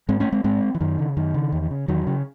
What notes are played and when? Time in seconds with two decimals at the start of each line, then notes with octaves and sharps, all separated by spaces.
0.09 G#2 G#3 C4
0.20 A3 C#4
0.32 G#3 C4
0.44 G#2 G#3 C4
0.75 E3
0.81 F#2 D#3
0.99 C#3
1.17 F#2 D#3
1.34 C#3
1.52 E2
1.71 C#3
1.88 E2 D#3 F#3
2.07 C#3